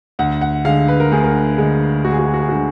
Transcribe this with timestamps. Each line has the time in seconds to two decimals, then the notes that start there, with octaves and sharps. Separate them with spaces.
0.19 D2 F#5
0.41 F#5
0.65 D3 G#3 F5
0.88 B4
1.00 A#4
1.12 D2 G#4
1.24 A#4
1.58 D3 G#3
2.04 D2 F#4
2.12 G#4
2.19 F#4
2.27 G#4
2.34 F#4
2.41 G#4
2.49 D3 G#3 F#4